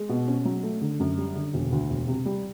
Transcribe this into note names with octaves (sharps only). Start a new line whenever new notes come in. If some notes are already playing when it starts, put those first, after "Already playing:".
Already playing: G#3
B2
C#4
F#3
A3
D3
F#2
G3
D3
E1
D2
E1
C3
G3